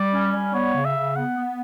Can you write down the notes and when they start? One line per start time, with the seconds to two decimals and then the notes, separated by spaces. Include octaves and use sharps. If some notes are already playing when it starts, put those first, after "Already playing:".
Already playing: G3 D5
0.12 C#4
0.32 G3
0.54 B3 C#5
0.74 C#3
0.85 E5
0.95 C#3
1.15 B3 F#5
1.37 B3